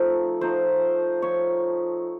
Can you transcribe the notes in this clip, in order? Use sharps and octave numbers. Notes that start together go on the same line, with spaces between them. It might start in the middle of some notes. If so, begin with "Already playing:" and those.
Already playing: F3 A3 D#4
F3 A3 D#4 C5
F3 A3 D#4 C#5